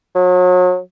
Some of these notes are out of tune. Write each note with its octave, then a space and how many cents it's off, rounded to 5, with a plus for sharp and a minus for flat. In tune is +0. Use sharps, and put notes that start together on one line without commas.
F#3 -35